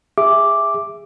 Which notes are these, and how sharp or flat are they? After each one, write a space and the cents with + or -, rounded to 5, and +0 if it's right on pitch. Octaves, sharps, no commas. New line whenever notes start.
G#4 -25 E5 +5 D6 +0